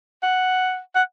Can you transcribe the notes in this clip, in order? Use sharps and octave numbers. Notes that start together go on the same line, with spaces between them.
F#5
F#5